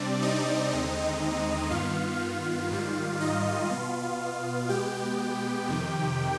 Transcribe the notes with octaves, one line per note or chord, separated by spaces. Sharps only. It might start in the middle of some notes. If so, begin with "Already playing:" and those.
Already playing: C3 G3 C4 D4 D5
D#4 D#5
D#2 D3 G#3 C4
G2 D#3 B3 F4 F5
G#2 D#3 G3
D#4 D#5
B2 B3 F4 F5
B2 G#3 B3 G4 G5
F2 C3 D#3